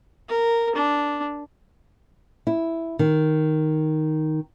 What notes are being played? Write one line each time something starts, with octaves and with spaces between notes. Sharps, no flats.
A#4
D4
E4
D#3